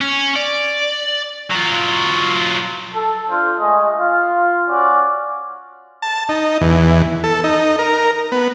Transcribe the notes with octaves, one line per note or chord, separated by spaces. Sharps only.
C#4
D5
F#3 F4
A4
D4 F4 C5
G#3 A3 D#5
F4
C#4 F#4 D5
A5
D#4
E2
A4
D#4
A#4
B3